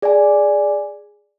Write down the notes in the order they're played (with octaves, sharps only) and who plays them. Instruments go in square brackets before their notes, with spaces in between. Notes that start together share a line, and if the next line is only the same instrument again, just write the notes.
[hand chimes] G#4 D5 G#5